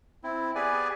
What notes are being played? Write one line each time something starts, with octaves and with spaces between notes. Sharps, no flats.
C4 E4
B3 G4 G#4 B4 D5 G#5